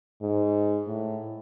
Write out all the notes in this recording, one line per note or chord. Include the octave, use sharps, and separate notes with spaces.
G#2
A2